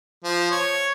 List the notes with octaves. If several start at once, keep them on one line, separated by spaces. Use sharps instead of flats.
F3
C#5